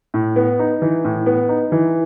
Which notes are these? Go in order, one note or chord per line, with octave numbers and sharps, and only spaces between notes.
A2
B3
D#4
E3
A2
B3
D#4
E3